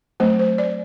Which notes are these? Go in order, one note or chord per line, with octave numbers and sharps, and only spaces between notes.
F#3 A3 C4 C5
C5
D5